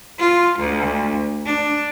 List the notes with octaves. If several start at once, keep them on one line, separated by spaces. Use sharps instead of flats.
F4
D2
D4